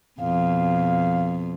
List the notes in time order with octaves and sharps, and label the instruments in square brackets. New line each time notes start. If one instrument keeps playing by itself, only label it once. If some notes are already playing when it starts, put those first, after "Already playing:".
[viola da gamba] F2 B2 [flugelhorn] F5